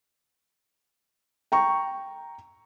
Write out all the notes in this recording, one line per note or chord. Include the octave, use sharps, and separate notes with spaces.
G5 A#5 C#6